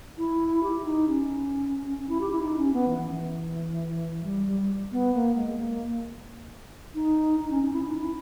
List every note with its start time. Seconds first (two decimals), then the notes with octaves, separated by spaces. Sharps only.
0.18 E4
0.63 G4
0.84 D#4
1.08 C#4
1.99 C#4
2.09 E4
2.21 G4
2.32 E4
2.42 D#4
2.58 C#4
2.73 B3
2.89 E3
3.11 E3
4.24 G3
4.47 G3
4.92 B3
5.14 A#3
5.36 G#3
5.59 A#3
6.95 D#4
7.40 D#4
7.50 C#4
7.63 C#4
7.73 E4
7.85 D#4
8.00 E4